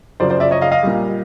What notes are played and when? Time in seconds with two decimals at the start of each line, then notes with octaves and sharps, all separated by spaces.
0.20 F#2 C#3 F3 C5 D5
0.30 C5 D5
0.40 D5 E5
0.51 C#5 D#5
0.61 D#5 F5
0.72 D#5 F5
0.83 A#2 G3